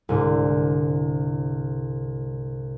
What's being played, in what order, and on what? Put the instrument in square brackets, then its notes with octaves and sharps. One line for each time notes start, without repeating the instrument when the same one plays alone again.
[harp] C2 G#2 D3